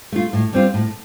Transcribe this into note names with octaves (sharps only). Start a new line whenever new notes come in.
A3 F4
A2
G3 C4 F4
A2